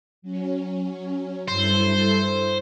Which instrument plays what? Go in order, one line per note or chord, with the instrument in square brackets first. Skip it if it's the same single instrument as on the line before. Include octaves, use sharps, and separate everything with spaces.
[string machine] F#3 C#4
[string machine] G2 E4 A4 [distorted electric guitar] C5